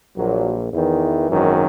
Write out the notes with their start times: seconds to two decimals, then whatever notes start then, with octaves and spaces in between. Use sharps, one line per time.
0.17 A#1 A#2 F#3
0.72 E2 D#3 E3
1.28 G#1 F#2 D#3